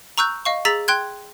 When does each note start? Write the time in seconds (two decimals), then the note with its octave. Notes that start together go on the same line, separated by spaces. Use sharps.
0.18 A#5 C#6 E6 F#6 G6
0.45 D#5 F5 C#6
0.65 G#4 A#5 E6 A6 B6 F7
0.88 G5 C6 F#6 G#6